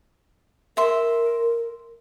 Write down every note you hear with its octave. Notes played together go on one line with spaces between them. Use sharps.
A#4 E5 C6